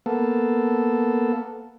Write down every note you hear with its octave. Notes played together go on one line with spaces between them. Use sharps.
A#3 B3 A4